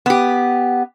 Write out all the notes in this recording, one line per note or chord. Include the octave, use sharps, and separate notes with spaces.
B3 G4